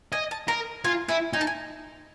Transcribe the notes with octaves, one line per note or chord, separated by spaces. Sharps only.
D#5 G#5
A5
A#4 A#5
F4 G#5
E4 G#5
D#4 G#5
A5
G#5